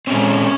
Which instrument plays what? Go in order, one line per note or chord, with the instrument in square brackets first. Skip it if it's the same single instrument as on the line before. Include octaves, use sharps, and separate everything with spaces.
[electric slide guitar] A#2 G#3 C4 C#4